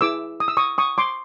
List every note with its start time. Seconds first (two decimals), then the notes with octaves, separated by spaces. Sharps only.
0.01 E4 G#4 B4 D6 E6
0.40 D#6
0.48 E6
0.57 C#6 D#6
0.78 C#6 D#6
0.98 C6 D6